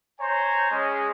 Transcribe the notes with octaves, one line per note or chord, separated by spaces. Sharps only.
C5 C#5 G#5 A#5
G#3 C#4